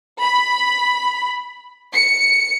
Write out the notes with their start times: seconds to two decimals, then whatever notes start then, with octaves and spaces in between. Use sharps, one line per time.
0.21 B5
1.92 C#7